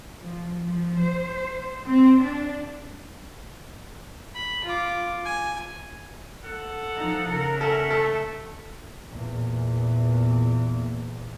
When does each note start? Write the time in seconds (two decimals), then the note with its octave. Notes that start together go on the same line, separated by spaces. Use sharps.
0.20 F3
0.68 F3
1.00 C5
1.87 C4
2.22 D4
4.35 B5
4.64 F4 D6
5.25 G#5
6.43 A4 F#5
6.96 F3 D#4
7.29 C#3 A#4
7.61 C#4 A4 A#4 E5 F#5
7.90 A3 A4
9.13 E2 A#2